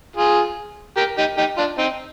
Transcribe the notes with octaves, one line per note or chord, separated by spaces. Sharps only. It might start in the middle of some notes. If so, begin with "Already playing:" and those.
F4 G#4
G4 A#4
D#4 G4
D#4 G4
D4 F4
C4 D#4